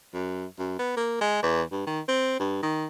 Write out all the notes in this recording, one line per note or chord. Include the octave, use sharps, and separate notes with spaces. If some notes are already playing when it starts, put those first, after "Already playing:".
F#2
F#2
B3
A#3
G#3
E2
G2
D#3
C4
G2
D#3